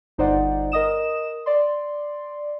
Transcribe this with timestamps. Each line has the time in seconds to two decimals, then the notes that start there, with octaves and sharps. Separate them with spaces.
0.18 G1 D#4 C5 D5 F#5
0.72 A#4 D#5 D#6 E7
1.46 D5 C6